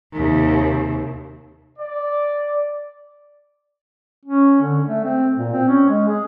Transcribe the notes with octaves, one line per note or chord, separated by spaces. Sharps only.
D#2 C3
D5
C#4
D3
A3
C4
A#2
C4
C#4
G#3
G#4